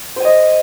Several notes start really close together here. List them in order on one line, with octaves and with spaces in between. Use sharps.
C5 G#5 D#5